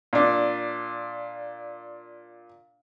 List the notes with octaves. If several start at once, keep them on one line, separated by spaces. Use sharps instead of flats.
A#2 D4